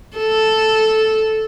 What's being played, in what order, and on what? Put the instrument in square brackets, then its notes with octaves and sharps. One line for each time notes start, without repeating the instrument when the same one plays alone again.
[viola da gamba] A4